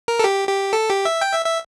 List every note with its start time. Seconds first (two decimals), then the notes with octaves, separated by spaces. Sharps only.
0.08 A#4
0.19 A4
0.24 G4
0.49 G4
0.73 A4
0.89 G4
1.05 E5
1.21 G5
1.33 E5
1.46 E5